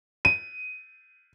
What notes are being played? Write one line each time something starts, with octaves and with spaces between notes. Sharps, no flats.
D#7